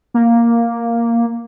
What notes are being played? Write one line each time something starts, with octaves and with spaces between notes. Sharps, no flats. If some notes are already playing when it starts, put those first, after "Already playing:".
A#3